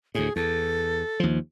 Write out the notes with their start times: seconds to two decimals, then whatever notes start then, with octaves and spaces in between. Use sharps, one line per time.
0.15 D2 A2 G#4
0.36 E2 A4
1.20 D#2 F3